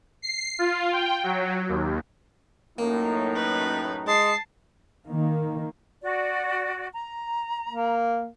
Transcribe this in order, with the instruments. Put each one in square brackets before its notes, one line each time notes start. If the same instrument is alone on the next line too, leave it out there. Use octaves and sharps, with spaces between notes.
[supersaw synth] C7
F4
G5
F#3
D#2
[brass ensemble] F#2 A2 D#4 [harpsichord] A#3
[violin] B4
[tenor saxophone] G#3 [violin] A5 C7
[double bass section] D#3 A#3
[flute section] F#4 D5
A#5
[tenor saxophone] A#3